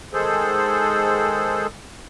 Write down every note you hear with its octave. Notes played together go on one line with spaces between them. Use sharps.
D#3 G#3 G#4 A4 C5